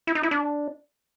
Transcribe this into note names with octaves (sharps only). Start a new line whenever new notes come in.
E4
D#4
E4
D4